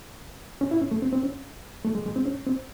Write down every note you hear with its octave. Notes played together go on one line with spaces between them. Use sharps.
C#4
E4
C#4
A3
C4
C4
C#4
A3
G#3
G#3
C4
C#4
C4